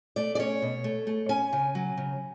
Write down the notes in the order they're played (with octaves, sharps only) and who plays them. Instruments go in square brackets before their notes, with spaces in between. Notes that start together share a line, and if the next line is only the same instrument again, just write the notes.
[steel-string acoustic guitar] A3 D5
D5
C#4 C#5
B2
A3
A3
C#4 G#5
C#3
F#3
C#3